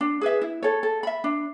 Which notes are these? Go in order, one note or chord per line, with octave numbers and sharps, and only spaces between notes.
D4
G#4 B4 E5
E4
A4 C#5
A4
E5 B5
D4